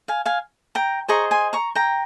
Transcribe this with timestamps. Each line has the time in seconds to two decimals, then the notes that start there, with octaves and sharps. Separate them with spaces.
0.08 F5 G#5
0.26 F5 G#5
0.75 G5 A#5
1.08 G#4 C5 D#5 A#5 C#6
1.31 G#5 C6
1.53 A#5 C#6
1.75 G5 A#5